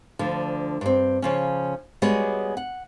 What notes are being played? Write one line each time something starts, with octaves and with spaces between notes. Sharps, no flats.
D2 D3 F3
G2 C4
C#3 F3 C#4
G3 G#3 B3 F#4 G#4 C#5
F#5